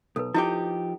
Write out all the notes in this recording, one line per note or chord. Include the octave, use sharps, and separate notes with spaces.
B1 A4 B4
F3 D#4 E4 G4 D6